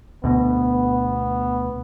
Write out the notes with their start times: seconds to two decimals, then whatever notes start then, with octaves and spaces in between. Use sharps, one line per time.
0.24 D2 B2 B3